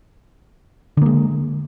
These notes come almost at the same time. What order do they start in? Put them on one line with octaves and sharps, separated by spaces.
D3 A#3 G#3